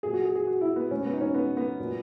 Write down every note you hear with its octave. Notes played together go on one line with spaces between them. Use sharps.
A#2 F#3 G#4
F#4
G#4
G#4
F#4
E4
B3
B2 G#3 C#4
B3
D#4
C#4
B3
B3
A#2 F#3